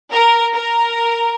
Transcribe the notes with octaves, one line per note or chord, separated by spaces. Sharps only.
A#4
A#4